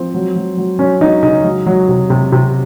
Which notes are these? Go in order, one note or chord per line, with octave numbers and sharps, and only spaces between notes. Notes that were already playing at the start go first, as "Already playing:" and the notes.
Already playing: F3 C4
F#3
F#3
F#3
F#3 C#4
F#3 D#4
C#3 D#4
F#3
F#3
C3
C3
C3